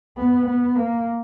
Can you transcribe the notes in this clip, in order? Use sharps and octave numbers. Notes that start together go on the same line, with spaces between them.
B3
B3
A#3